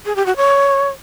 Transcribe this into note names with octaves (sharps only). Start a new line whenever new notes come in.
G#4
G4
F#4
C#5